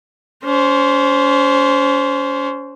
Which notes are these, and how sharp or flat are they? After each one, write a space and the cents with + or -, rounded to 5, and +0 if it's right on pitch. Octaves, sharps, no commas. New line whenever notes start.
C#4 +35 C5 +0